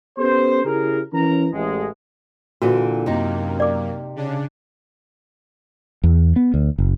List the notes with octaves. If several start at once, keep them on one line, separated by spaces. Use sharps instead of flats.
B3 C#4 G4 A4 C5
C#3 E4 G4 G#4 A#4
E3 C#4 A#4 A#5
A1 G#3
A#2 D3 E3 F#4
F#2 C3 A#3 D#4
D5 D6
C#3 D4
E2
B3
D2
F#1